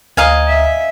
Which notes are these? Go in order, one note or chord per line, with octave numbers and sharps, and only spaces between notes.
D2 D#5 F5 G#5 A#5 D#6
E5